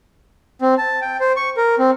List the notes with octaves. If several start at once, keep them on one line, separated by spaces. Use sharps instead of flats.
C4
A5
G5
C5
C#6
A#4
C4